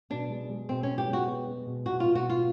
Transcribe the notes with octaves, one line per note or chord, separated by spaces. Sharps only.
B2 D4
G#3
G#3
B2 C4
C#4
B3
G4
G#3
F#4
B3
G#3
B2
B2 F#4
F4
B2
F#4
B2 F4